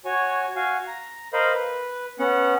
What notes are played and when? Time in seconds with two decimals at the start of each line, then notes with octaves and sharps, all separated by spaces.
0.05 F#4 C#5 G#5
0.56 F#4 F5 G#5
0.88 A#5
1.33 A#4 C5 D#5 F5 B5
1.54 B4
2.19 B3 C#4 F#5